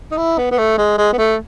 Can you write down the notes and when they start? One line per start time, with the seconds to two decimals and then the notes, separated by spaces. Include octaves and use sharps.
0.11 D#4
0.17 E4
0.38 B3
0.51 B3
0.58 A3
0.78 G#3
0.98 G#3
1.13 B3
1.18 A3